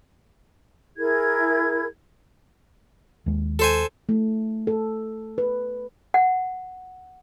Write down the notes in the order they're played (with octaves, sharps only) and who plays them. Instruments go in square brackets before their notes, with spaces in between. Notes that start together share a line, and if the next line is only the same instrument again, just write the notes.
[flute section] E4 G#4 A#4 G#6
[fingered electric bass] D#2 G#3
[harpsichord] A4 C5 G#5
[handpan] A3
A4
B4
[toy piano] F#5